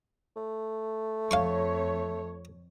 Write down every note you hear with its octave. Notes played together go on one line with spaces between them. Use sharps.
A3
F2 C#5 F5 C6 C#6